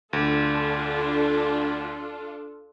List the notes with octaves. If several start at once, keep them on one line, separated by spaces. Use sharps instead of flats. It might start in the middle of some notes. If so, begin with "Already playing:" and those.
D2 D4 F4 A4